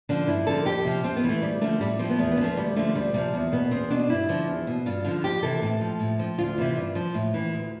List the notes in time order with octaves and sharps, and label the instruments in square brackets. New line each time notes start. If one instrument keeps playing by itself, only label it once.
[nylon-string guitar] D3 F3 D4
G2 E4
D3 F3 A4
F2 G4
C3 F3
F2 C4
B3
E3
A3
D2 G3
D3 F3 A3
A2 G3
F3 C4
B3
E2 A3
B3
D3
F3 A3
D2 G3
D3 F3 A3
D2 G3
C3 F3 G3
E2
B2 B3
E2 C4
B2 D4
G2 E4
D3 F3
E2
B2
G2 F4
D3 F3 F4
F2 G4
C3 E3 A4
A2
F3
A2
F3
D2 F4
C3 E3
G2
F3
A2
E3
D2